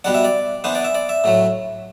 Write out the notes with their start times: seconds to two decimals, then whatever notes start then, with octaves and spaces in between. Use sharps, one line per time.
0.04 B2 G3 D4 F#5
0.14 E5
0.25 D5
0.64 E3 B3 D4 C5
0.75 D5
0.84 E5
0.95 D5
1.09 E5
1.24 A2 F#3 A3